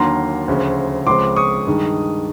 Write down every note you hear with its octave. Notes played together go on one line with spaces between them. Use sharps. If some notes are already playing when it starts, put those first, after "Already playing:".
Already playing: D#2 D3 F#3 A#3 A#5 C6
D2 C#3 F3
C#2 C#3 F3 G#3 C4 C6 D6
C#6 D#6
G2 D#3 G#3